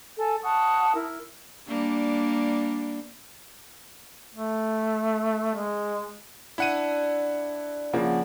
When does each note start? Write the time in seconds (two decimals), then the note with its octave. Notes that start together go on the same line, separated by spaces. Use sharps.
0.17 A4 G#5
0.43 F#5 A5 C#6 D#6
0.94 E4 A#4
1.67 G3 A#3 D4
4.35 A3
5.55 G#3
6.58 D4 E4 F#5 D#7
7.93 C#3 F3 A#3 F#5